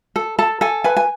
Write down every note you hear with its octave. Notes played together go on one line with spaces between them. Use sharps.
A4
A4 A5
A4 G#5
B4 G#5
G#5